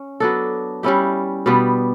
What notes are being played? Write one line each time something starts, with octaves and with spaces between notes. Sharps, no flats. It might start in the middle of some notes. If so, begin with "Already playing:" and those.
Already playing: C#4
F#3 B3 D4 A4
G3 C#4 E4 G4
B2 G3 B3 D4